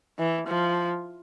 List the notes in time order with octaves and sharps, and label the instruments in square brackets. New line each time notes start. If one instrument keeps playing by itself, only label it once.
[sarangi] E3
F3